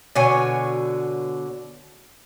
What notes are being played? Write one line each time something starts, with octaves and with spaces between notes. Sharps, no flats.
B2 D3 C#5 G#5